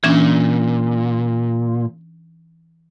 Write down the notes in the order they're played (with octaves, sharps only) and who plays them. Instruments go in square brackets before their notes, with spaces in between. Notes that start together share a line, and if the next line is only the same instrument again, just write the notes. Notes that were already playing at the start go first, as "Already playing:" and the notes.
[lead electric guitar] A#2 [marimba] E3 C#4 D4